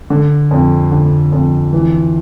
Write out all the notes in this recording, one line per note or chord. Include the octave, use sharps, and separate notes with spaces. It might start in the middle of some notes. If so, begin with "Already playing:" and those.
D3
F2
D3
F2
E3